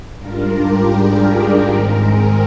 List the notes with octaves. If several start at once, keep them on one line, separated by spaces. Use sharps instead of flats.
G#2 G3 D4 F4 A#4
G4
G#4
A#4
G#2 D#3 G#3 C4 A#4
G#4